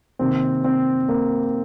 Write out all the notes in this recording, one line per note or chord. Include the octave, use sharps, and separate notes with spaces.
C3 D#3 A#3 C4
C4
A#3